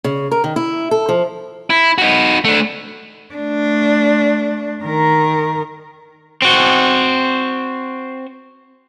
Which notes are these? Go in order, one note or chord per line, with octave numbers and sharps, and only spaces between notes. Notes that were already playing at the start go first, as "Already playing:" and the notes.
C#3
A#4
D#3
E4
A4
F3
E4
D#4 F#4
A3 D4
A3 D4
D#3 A#4
C4 F#4